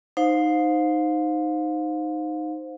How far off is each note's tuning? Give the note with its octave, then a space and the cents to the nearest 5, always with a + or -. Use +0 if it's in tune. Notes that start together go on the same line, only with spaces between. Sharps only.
D#4 -10 C5 +0 F5 +30